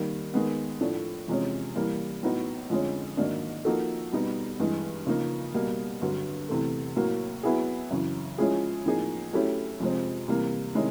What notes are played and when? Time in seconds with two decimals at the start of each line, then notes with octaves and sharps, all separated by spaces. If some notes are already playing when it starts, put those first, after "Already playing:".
Already playing: D#3 G3 A#3
0.34 D#3 G#3 B3
0.81 A2 F3 A3 D4
1.28 E2 C3 F3 G#3 C#4
1.76 E3 G3 A#3
2.23 A2 F#3 B3 D#4
2.70 F2 D3 F3 G#3 C#4
3.17 G#2 D#3 F#3 A#3 D4
3.65 F3 A#3 D#4 F#4 A4
4.12 B2 G3 B3 D#4
4.60 G2 E3 G#3
5.07 C#3 F3 A#3 D#4
5.54 B2 G3 A#3
6.02 G2 D3 F#3
6.49 E2 C3 E3 A3
6.96 A2 F#3 A#3
7.43 F#3 B3 E4 G#4
7.91 F#2 C#3 E3
8.38 F3 G#3 C#4 E4 G#4
8.86 A2 F3 A#3 D#4 G#4
9.33 F#3 A3 C#4 E4 G4
9.80 F2 C3 F3 G#3 C4
10.28 C3 E3 G3 A#3
10.75 C3 D#3 G#3 C#4 E4